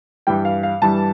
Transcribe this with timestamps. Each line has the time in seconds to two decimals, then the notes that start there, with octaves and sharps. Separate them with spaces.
0.27 G2 E3 G3 G5
0.45 F5
0.63 F5
0.82 G2 E3 G3 A5